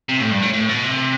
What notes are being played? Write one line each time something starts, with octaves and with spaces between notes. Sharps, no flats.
C3
A2
G2
A2
A2
B2
C3